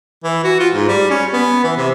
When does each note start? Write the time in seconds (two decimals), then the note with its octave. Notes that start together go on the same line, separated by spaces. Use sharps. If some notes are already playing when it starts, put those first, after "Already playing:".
0.24 E3
0.44 F#4
0.60 F4
0.74 G#2
0.88 G3
1.11 C#4
1.33 B3
1.64 E3
1.77 C3